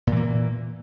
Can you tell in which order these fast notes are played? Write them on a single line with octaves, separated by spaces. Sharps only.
A#2 E3 A#3